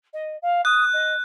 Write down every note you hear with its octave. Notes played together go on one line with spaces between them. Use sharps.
D#5
F5
D#6 F#6
D#5